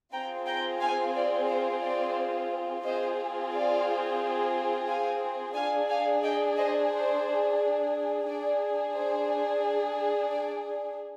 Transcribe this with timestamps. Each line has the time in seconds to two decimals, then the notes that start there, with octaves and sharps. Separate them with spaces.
0.12 C4 F4 G#4 G5 A#5
0.47 G5 A#5
0.80 F5 G#5
1.15 D5
1.48 C5
1.82 D5
2.84 C4 F4 G#4 C5 D#5
3.52 D5 F5
4.88 F5 G#5
5.55 D4 G#4 F5 G#5
5.90 F5 G#5
6.23 D#5 G5
6.57 C5 D#5
6.91 C5
8.27 D4 G#4 D5
8.95 C5
10.31 D5